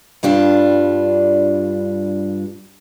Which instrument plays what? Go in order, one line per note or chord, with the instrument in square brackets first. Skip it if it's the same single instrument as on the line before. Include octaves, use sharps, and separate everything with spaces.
[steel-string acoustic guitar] G2 G3 D4 F4